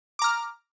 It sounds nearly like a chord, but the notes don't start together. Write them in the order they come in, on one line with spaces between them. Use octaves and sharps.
D6 A#5 F6